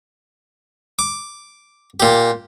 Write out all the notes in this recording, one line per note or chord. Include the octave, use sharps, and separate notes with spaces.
D6
A#2 G4